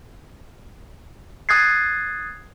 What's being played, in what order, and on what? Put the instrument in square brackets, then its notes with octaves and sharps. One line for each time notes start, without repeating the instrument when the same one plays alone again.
[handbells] D#6 F#6 G#6 A6 C7